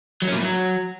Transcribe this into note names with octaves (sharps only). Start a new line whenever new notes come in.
F#3
C#4
A#2
A2
F#3